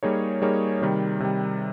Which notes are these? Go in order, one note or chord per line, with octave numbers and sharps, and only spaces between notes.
G3 A#3 D#4 G#4 C#5
G3 A#3 D#4 G#4 C#5
C3 D#3 G3
C3 D#3 G3